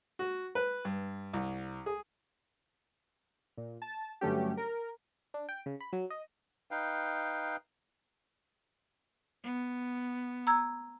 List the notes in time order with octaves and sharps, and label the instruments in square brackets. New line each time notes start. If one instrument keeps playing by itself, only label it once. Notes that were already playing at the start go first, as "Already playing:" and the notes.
[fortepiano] F#4
B4
G2
C2
G#4
[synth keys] A#2
A5
G2 D3 F#3 A3 C#4 G4
A#4
[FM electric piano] D4
G5
C#3
B5
F#3
D#5
[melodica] D#4 B4 F5 G5
[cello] B3
[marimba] A#5 E6 G#6